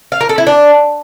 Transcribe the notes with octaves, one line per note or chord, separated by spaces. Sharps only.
F5
A#4
A4
E4
D4